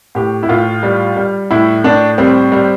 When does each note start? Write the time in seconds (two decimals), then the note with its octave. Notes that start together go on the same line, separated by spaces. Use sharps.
0.15 A2 G4
0.43 E4
0.49 A2 F4
0.83 G3
1.16 G3
1.51 A2 E4
1.84 A2 D4
2.18 G3 C4
2.52 G3